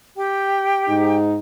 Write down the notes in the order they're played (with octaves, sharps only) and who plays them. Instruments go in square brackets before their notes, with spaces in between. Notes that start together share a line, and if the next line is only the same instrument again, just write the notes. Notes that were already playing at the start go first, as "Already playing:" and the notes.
[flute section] G4 G5
[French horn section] G#2 D#4